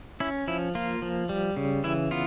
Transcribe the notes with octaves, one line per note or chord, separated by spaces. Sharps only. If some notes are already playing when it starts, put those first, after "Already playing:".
C#4 E4
F3 E4
A#3 F4
F3
G3
C#3
E3 E4
B3 F4